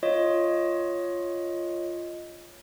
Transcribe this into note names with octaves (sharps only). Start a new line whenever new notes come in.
F4 C#5 D#5